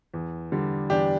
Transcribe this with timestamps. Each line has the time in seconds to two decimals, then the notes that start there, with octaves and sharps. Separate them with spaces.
0.14 E2
0.52 D3 G3
0.90 E2 D4 G4